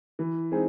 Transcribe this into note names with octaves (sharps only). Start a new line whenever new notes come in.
E3
G#3 C4 D#4 G#4